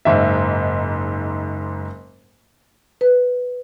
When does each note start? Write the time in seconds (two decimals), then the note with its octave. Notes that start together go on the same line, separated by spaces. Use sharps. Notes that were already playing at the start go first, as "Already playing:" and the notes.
0.05 F#1 G#2 E5
3.01 B4